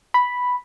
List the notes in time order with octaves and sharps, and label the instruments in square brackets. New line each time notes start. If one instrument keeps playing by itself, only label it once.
[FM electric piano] B5